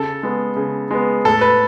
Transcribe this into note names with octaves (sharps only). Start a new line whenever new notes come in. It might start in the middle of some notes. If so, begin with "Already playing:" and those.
Already playing: C#3 A4
G#3 B3
C#3
G#3 B3
A2 A4
B4